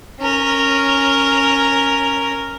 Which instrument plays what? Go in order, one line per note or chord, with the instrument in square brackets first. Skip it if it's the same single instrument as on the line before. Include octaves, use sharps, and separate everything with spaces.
[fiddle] C#4 A#4